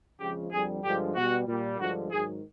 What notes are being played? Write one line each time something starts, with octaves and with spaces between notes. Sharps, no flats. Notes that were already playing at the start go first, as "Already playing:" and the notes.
F2 C#3 F3 G#3 G4
F2 D3 G3 G#4
G2 D3 F3 G#3 G4
B2 G3 F#4
A#2 G3
G2 D3 F3 G#3 F#4
G#2 D#3 F#3 G#4